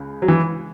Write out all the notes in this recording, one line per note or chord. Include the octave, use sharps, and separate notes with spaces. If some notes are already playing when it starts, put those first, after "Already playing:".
Already playing: C#2 C#3
F#3
E3